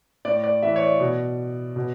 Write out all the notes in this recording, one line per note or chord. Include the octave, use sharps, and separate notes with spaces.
A2 D5
D5
E3 E5
C#5
D5
B2
B2